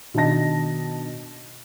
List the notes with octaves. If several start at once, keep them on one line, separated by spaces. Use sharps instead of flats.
B2 D#3 D4 D#5 A5 A#6